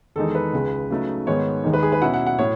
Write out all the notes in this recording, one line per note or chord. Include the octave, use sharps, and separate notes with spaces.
E2 D#3 G#3 D#4 A4
B4
C#2 C#3 G#3
C#3 F#3 A3 D#4
G#2 D#3 G#3 B3 C#5
D#2 D#3 G#3 D#4
B4
G#4
B4
B2 F#3 C#4 E4 F#5
F#5
F#5
A2 F#3 C#5